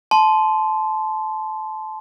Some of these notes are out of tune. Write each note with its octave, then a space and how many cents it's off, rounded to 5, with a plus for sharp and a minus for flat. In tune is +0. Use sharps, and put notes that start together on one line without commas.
A5 -20 C6 -10